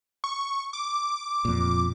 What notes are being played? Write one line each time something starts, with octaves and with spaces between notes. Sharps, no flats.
C#6
D6
F2 A#2